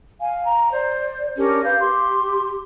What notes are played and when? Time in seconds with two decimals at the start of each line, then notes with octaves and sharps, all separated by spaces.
0.19 F5 G#5
0.44 A#5
0.72 C5 D5
1.37 C#4 D4 G4 A#4
1.63 B4 F5 G6
1.79 G4 C6